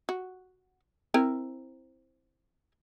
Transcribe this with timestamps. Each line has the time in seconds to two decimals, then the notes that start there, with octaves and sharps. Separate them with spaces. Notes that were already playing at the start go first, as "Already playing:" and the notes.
0.09 F#4
1.14 C4 E4 A#4